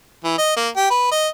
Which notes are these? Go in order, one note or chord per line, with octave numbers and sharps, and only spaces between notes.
E3
D#5
A#3
G4
B4
D#5